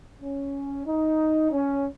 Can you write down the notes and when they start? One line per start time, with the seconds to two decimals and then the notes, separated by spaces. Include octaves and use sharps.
0.19 C#4
0.86 D#4
1.51 C#4